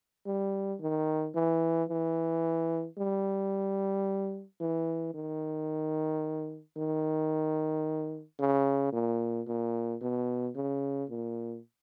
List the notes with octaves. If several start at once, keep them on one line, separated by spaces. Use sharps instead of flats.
G3
D#3
E3
E3
G3
E3
D#3
D#3
C#3
A#2
A#2
B2
C#3
A#2